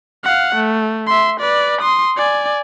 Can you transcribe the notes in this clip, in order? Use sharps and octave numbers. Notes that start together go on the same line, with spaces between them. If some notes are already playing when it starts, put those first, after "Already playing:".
F5 F#5
A3
E5 C6
B4 D5
C6 D#6
D5 G#5